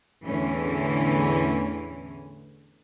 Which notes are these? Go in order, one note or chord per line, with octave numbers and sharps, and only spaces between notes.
E2 A2 D3 E3 C#4